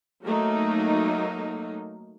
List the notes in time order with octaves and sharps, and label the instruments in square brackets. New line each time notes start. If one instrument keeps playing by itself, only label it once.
[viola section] F#3 A3 A#3 D#4